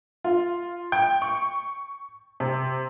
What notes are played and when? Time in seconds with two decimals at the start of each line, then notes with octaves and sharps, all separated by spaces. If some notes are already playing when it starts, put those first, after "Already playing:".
0.24 F4
0.92 G5
1.22 C#6
2.40 C3